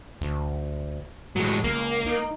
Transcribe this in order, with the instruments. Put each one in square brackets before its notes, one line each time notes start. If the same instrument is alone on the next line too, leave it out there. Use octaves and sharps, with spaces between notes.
[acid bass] D2
[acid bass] A2 [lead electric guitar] F#3 G#3
[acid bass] C#2 [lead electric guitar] A#3
[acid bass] D#4